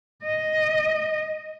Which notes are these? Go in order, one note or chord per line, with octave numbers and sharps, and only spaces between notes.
D#5